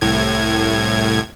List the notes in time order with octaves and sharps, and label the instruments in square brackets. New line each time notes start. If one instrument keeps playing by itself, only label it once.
[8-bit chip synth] C2 A2 G#6